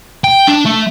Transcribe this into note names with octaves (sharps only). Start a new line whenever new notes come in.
G5
D4
A3